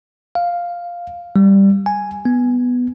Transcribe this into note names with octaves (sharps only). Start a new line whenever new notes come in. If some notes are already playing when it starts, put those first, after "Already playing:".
F5
G3
G#5
B3